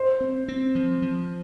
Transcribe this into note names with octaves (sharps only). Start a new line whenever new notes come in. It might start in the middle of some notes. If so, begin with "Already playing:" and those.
Already playing: C5
C4
C4
F3
F3